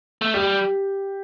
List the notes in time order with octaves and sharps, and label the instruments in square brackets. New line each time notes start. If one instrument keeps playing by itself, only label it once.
[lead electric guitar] A3
[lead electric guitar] G3 [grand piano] G4